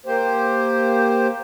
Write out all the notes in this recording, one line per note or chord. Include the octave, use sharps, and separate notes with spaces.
A#3 G4 C5